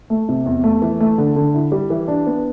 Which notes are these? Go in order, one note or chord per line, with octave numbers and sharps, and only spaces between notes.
A3
C3
E2
A3
E3
A3
D3
D3
E4
G3
E3
D4
B3